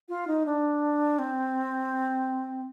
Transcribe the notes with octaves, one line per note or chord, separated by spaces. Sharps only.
F4
D#4
D4
C4